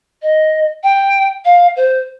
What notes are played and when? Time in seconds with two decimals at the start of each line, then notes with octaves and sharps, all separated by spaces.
0.22 D#5
0.83 G5
1.45 F5
1.76 C5